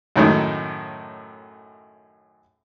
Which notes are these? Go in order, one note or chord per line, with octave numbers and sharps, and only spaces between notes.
F#2 A2 D#3 G#3 A3